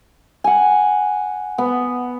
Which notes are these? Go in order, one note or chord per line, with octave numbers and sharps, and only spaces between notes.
F#5 G#5
B3